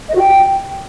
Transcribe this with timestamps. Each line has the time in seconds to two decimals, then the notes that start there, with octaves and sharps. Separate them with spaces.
0.09 D#5
0.15 F#4
0.20 G5